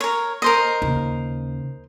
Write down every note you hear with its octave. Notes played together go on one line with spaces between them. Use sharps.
A#4 C#5
A#4 C5 D#5
D#2 C#3